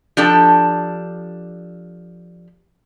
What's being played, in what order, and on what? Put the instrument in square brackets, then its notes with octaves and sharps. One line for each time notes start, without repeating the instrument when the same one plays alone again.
[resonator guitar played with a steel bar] F3 D4 G4 A4